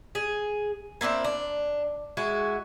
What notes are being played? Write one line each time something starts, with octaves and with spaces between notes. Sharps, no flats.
G#4
A#3 C4 D4 E4
D4
G#3 E4 F#4